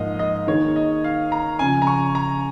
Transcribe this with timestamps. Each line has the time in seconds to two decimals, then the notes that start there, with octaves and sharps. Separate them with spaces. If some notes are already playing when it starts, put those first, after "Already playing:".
Already playing: G#2 F3 A#3 D#5 F5
0.19 D#5
0.48 D#3 A#3 D#4 G#4 C#5
0.76 D#5
1.04 F5
1.32 A#5
1.59 C#3 F3 C#4 F4 G#5
1.82 A#5
1.87 C#6
2.15 A#5